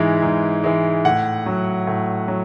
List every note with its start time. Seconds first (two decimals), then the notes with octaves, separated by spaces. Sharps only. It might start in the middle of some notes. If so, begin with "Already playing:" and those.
Already playing: G#2 E3 G#3
0.22 G#2
0.64 E3 G#3
1.05 A2 F#5
1.46 F#3
1.87 A2
2.28 F#3